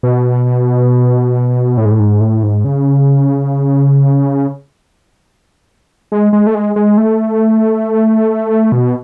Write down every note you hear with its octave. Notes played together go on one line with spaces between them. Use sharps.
B2
A2
G#2
A2
G#2
A2
G#2
C#3
G#3
G#3
A3
G#3
G#3
A3
B2